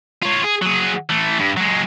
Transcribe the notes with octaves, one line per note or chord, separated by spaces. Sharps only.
F4 C#5
G#4
F#3 G#4
E3 A3
G2
F#3 G#3